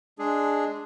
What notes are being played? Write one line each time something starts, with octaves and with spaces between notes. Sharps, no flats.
G#3 D4 G#4